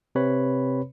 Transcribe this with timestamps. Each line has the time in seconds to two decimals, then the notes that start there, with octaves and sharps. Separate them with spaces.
0.15 C3 C4 B4 C#5 B5